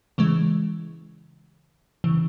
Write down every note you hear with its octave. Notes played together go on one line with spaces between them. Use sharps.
C#3 E3 G#3
C#3 E3